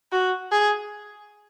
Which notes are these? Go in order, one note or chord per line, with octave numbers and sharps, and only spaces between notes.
F#4
G#4